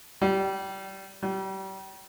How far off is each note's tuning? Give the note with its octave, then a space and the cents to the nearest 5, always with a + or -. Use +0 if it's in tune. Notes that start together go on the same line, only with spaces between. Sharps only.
G3 -25
G3 -35